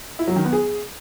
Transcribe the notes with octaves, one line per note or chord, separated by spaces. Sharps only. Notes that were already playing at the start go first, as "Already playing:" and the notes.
E4
F#3
D#3
B3
G#4